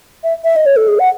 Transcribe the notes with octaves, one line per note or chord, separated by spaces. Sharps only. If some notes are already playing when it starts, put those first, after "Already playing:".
E5
E5
D#5
C#5
A4
G#4
F#5